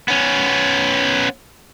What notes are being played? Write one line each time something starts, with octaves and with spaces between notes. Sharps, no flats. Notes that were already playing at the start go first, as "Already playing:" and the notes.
B3 C#4